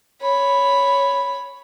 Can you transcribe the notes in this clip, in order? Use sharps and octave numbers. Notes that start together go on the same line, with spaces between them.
C#5 B5